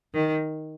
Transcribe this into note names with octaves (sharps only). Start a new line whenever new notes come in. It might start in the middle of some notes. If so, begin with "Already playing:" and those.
D#3